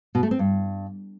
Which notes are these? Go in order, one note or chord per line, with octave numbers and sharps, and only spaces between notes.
B2
A3
C4
G2